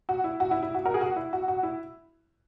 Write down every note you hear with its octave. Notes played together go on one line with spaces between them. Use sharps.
F#4
E4
F#4
E4
E4
F#4
F#4 A#4
G#4
F#4
E4
F#4
F#4
E4